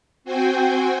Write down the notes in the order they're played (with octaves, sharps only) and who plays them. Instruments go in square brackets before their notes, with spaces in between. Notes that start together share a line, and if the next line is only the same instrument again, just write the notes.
[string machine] C4 F#4 C5 G5 G#5